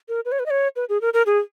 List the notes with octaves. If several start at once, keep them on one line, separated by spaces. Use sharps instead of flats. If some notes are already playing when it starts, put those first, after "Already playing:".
A#4
B4
C#5
B4
D#5
C#5
B4
G#4
A#4
A#4
G#4